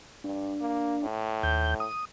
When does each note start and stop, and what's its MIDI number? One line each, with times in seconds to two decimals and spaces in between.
0.24 0.55 43
0.24 1.06 62
0.61 0.97 58
1.03 1.87 45
1.43 1.74 39
1.43 1.74 91
1.80 2.05 87